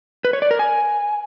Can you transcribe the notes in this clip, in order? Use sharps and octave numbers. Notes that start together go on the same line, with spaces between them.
B4
C#5
D5
A#4
G#5